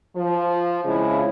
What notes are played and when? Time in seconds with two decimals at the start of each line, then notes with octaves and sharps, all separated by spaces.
0.16 F3
0.85 F2 C#3 F3 G#3 E4